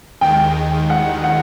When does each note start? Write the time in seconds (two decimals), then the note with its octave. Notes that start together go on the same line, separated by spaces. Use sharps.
0.21 D#2 D#3 G#3 G5
0.90 F#5
1.24 F#5